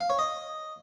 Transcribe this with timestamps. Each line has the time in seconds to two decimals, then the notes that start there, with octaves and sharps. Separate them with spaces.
0.01 F5
0.10 C#5
0.19 D#5